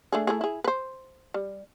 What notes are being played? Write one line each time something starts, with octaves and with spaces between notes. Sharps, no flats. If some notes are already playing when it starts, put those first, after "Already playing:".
A3 D4 G#4
A3 E4 G#4
E4 G#4
B4 C5
G3